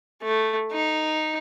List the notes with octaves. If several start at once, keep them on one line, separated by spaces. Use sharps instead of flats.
A3
D#4